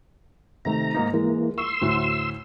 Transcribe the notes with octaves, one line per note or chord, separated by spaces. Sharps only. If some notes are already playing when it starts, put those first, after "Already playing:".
C3 D#3 A3 A#5
G#2 A#3 D#4
E3 G#3 A#3
C6 C#6 E6
D2 A2 F#4